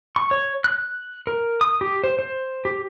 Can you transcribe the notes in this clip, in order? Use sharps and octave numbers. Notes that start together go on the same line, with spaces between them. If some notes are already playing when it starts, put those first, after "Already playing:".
C#6
C#5
F#6
A#4
D#6
G4
C5
C5
G4